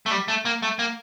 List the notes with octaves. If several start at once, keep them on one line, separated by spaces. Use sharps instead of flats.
A3
G3
A3
A#3
A3
A#3